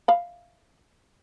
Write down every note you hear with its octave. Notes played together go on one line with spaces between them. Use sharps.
F5 B5